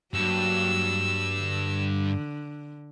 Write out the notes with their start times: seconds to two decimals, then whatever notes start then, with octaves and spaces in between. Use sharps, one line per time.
0.14 G2 F#3 A#3 D4 E6
1.37 D3